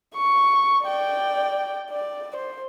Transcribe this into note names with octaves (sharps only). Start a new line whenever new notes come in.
C#6
D5 G5
D5
C5